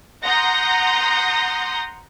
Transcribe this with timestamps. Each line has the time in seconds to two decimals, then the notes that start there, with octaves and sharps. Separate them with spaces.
0.23 F#5 A#5 C6 D#6 G6 A#6